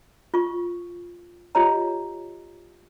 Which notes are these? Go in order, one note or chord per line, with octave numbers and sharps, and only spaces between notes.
F4 C#6
F4 G4 C#5 D#5 A#5